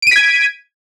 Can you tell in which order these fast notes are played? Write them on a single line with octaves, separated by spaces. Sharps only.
D7 D#7 B6 G#6